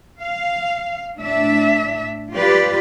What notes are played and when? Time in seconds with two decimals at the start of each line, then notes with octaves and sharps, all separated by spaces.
0.20 F5
1.19 A2 D4 E5
2.34 F4 G4 B4 D5